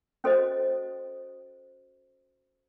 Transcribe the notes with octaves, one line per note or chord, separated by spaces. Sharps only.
C#4 F#4 A4 C5 D#5